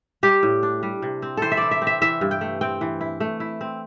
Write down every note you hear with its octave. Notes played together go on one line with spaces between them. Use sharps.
G3 G4
A2
D4
G3
C3
C4
E3 A4 C5
E5
E4 D5
E5
C4
E5
E3 E5
G2
G5
A3
C4 G5
E3
E4
A3
E4
C4